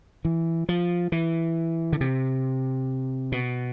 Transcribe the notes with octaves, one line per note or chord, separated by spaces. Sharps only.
E3
F3
E3
D3
C3
B2